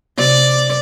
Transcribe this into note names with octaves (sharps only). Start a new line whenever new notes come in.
C3 D5